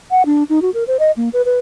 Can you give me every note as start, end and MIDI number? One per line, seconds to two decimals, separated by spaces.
0.11 0.25 78
0.26 0.43 62
0.49 0.60 63
0.62 0.70 66
0.74 0.84 70
0.87 0.97 72
0.99 1.11 75
1.17 1.29 58
1.33 1.42 71
1.45 1.59 71